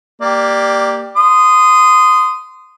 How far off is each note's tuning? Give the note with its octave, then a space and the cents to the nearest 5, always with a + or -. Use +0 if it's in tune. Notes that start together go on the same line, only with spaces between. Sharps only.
A#3 +0 G4 +0 D5 +10
C6 -25 D#6 -5